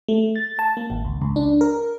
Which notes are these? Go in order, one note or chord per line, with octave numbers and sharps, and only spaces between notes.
A3
A6
A5
A#3
G#1
C#2
C#2
D4
A#4